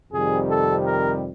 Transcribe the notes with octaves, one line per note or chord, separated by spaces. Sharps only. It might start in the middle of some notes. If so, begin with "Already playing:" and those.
F2 C3 D#3 G3 G#4
A4
A#4